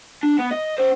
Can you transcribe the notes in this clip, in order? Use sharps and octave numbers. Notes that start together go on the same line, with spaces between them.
D4
B3
D#5
C#4 C5